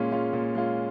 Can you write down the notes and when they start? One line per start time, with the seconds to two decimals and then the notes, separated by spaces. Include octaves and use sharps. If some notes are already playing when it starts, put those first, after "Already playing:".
Already playing: A#2 G#3 C#4 F4
0.12 G#3 C#4 F4
0.33 A#2
0.55 G#3 C#4 F4